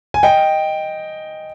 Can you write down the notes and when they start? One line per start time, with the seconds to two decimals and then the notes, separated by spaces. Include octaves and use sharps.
0.14 G#5
0.23 D#5 G5